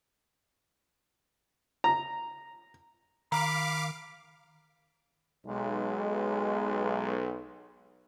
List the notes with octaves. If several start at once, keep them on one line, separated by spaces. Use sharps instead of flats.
A#5
D#3 F5 A#5 B5 D6
B1 G#3